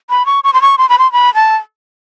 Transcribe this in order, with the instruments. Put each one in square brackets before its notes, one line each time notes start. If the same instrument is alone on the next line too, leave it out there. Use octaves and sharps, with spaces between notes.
[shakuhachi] B5
C#6
C#6
C6
C#6
C6
B5
C6
B5
A5